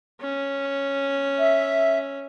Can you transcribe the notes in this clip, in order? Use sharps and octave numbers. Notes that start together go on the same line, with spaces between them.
C#4
E5